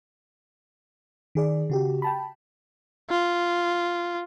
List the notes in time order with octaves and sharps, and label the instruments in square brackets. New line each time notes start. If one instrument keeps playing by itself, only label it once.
[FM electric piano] D#3 G#4 D5
C#3 F#4 G4
G5 A5 B5
[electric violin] F4